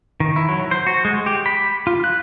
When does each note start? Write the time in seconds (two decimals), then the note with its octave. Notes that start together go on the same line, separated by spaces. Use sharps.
0.20 D#3
0.36 E4
0.48 F#3
0.71 C5
0.87 F#4
1.05 G#3
1.26 G4
1.46 B5
1.87 F4
2.04 F#6